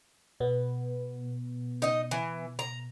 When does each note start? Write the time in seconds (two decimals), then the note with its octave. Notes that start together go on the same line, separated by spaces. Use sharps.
0.40 B2 B3
1.82 D#4 D#5
2.11 E3
2.59 A#5